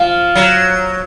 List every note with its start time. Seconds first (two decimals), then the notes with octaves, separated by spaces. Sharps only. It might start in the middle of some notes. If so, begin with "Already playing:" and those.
Already playing: F3
0.35 F#3